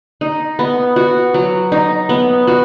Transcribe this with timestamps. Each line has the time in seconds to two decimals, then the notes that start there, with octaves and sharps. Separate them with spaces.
0.21 D#4
0.59 B3
0.96 F#4
1.34 F#3
1.72 D#4
2.09 B3
2.47 F#4